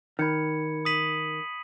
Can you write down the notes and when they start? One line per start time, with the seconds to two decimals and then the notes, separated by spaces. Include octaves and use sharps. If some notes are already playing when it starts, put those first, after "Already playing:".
0.19 D#3 B5 G#6 C#7
0.85 D#6 B6 D#7 F#7